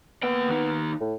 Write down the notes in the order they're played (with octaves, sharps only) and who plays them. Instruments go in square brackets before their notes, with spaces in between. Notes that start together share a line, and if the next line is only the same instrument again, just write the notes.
[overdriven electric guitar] A#3 G5 [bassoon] B3
[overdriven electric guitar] D#2 D#4
[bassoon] A2